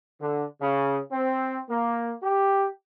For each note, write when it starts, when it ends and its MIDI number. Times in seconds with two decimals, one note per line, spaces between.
0.21 0.45 50
0.60 0.99 49
1.11 1.59 60
1.70 2.13 58
2.22 2.67 67